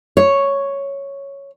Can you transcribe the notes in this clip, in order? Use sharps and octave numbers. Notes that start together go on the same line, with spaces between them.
C#5